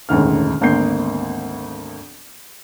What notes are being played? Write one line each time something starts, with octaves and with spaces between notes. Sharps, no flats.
E1 A1 D2 D#3 F6
G#1 D2 A#3 B3 G6 C7